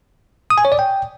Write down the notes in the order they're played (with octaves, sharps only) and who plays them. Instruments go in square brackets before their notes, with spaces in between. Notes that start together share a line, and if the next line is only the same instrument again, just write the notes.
[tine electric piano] D#6
G#5
C#5
D5
G5